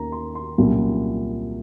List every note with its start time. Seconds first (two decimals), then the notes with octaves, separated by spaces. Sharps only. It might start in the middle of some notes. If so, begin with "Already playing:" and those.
Already playing: D#2 D#3 A#3 C#4 A#5
0.12 C6
0.35 C6
0.58 C2 A#2 F#3 A#3 C#4